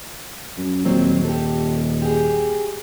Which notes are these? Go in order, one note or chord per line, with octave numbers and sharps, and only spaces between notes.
F#2
D#1 F#3 C4
G4 A4
G4 G#4